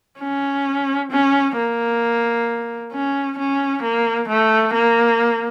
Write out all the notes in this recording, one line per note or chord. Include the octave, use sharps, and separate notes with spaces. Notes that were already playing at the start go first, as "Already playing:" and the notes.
C#4
C#4
A#3
C#4
C#4
A#3
A3
A#3